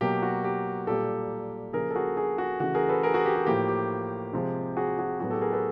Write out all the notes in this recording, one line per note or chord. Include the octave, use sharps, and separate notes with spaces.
B2 F#3 A#3 G4
F#4
G4
A#2 G3 A#3 G4 A4
C#3 F3 A#3 G#4 A#4
A4
F#4 G#4
F#4 G#4
F#4 G#4
C#3 E3 A3 F#4
G#4 A#4
A4 B4
G#4 A#4
F#4 G#4
G4
G4
A2 F3 A#3 G4
G4
C3 F3 G#3
F#4 G#4
F#4 G#4
A2 F#3 B3 F#4 G#4
G4 A4
G#4 A#4
A4 B4